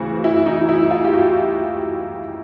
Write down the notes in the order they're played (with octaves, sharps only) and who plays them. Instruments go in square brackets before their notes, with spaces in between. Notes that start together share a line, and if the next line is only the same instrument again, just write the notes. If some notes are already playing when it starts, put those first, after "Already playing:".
Already playing: [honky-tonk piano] D2 C#3 E3 C4 F#4
E4
D#4
E4
F4
G4
F#4